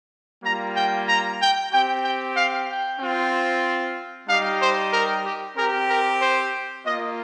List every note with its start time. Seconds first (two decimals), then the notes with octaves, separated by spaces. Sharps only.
0.44 G3 A#3 F4 A#5
0.76 G5
1.08 A#5
1.41 G5
1.73 C4 G4 G5
2.05 G5
2.36 F5
2.69 G5
3.00 C4 F4
4.28 G3 D#4 G4 F5
4.61 C5
4.93 A#4
5.25 G4
5.56 C4 G4 A#4
5.89 A#4
6.21 C5
6.85 A#3 F4 D#5